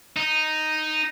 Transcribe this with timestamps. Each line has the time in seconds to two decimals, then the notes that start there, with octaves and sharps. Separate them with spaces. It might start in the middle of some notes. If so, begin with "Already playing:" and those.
0.16 D#4